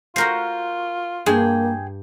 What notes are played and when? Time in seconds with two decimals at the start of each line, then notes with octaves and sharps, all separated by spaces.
0.16 F4 F#4 A#4 C5
1.26 G2 A#3 G#4 G5